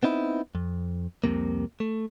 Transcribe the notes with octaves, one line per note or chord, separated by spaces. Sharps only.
B3 C4 D#4 E4
F2
C2 F2 C3 A#3
A3